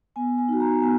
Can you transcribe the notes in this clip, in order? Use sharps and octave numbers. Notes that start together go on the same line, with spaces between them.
B3 G#5
G#5
D#4 F#4
A#5
B3 G#5